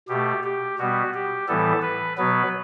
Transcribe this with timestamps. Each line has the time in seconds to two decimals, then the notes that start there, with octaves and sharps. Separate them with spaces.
0.08 B2 A3 G4
0.43 G4
0.78 B2 G3 B3 F#4
1.14 G4
1.48 A2 E3 G3 B3 A4
1.82 B4
2.18 B2 F#3 B3 B4